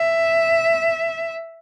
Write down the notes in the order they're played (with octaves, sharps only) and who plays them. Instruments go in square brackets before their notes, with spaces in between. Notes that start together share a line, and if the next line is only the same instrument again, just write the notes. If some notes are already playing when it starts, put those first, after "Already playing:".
Already playing: [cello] E5